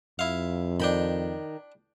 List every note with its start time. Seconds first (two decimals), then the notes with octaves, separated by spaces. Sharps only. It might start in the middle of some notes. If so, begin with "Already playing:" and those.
0.19 F2 E4 F5
0.80 D#3 D4 G5 B5